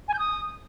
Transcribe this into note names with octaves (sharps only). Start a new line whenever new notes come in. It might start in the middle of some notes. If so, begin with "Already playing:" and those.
G#5
G6
D#6